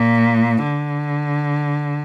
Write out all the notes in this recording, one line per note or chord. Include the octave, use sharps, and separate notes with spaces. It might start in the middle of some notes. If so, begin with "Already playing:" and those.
Already playing: A#2
D3